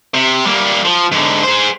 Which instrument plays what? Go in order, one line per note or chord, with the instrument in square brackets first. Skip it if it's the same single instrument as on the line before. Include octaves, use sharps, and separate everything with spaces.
[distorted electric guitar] C3
G3 A#3
F3
G#2 D3
G#4 C5